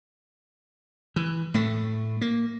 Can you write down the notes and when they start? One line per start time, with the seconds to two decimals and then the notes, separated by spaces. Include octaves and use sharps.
1.16 E3
1.54 A2 A3
2.21 A#3